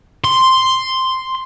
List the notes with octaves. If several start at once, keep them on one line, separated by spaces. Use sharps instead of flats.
C6